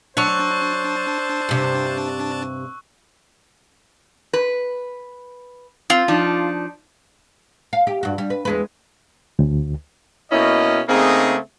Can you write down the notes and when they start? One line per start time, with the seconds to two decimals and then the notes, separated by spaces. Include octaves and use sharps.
0.17 F#3 D4 C5 C#5 A5 C#6 E6 F#6
1.49 G2 C3
4.33 B4
5.90 C4 F4
6.08 F3 D4 D#4
7.73 F5
7.87 G4
8.03 G2 F#4
8.18 G3
8.30 B4
8.45 E2 G#3 B4
9.39 D2
10.32 B2 A#3 C#4 E4 D#5
10.88 C#3 A3 A#3 C4 D#4 G#4